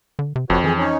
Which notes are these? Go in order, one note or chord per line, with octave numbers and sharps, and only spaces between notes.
D3
C3
F#1 F2 F#4 B4 C#5
E3 C4 G#4 G#5
C#4 D#4 C#5